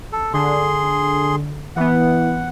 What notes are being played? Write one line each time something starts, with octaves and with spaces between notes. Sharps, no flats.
A4
D3 G#4 C6
E3 B3 F#5